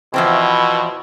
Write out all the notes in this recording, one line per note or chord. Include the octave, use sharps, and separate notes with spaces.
E2 B2 F3 C4 E4